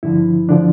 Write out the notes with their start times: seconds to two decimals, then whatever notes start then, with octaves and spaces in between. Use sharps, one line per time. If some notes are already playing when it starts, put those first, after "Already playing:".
0.03 G2 D3 F3 E4
0.49 D3 F3 D4